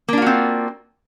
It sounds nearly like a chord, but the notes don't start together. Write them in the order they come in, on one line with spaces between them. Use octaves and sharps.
A#3 D4 F4 F#4 C4